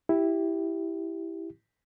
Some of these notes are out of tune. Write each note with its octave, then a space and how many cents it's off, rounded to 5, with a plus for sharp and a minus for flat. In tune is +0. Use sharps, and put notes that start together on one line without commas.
E4 +0 G4 +0